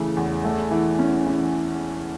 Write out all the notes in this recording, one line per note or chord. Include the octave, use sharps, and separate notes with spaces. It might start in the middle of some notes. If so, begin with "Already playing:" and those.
Already playing: C#3 E3 A3
E2
A3
E3
C#4
E3